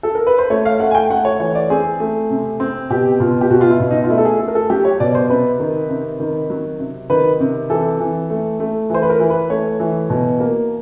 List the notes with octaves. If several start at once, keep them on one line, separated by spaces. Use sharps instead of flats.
A4
A#4
B4
C5
A3 C#5
F5
A3 F#5
G#5
G5
A3 F#5
C#5
E3 C#5
D5
C4 G#4
A3
C3
C4
B2 G4
B2 F4
G4
B2 F#4
F4
E4
B2
D#4
F4
A3 E4
A4
G#4
A3 A4
A#4
A4
F#3 G4
C#5
B2 D5
C5
C3 B4
D#3
C3
D#3
F#3
C3
D#3 B4
C3
E3 A4
E3
A3
A3
E3 C5
B4
A#4
E3
B4
A3 C#5
E3
B2
A#3